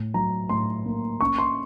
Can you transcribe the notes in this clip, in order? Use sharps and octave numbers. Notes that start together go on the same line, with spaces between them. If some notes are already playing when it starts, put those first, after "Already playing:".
Already playing: A2
F#3 A#5
A2 C6
A#3
C#4 C#6
C6